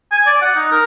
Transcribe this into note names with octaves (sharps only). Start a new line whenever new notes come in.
G#5
D5
F#5
D#4
A#4